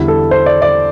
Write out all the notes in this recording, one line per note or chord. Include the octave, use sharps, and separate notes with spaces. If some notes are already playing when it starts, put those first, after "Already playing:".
Already playing: E2 D3 G3 E4
A4
C5
D5
D5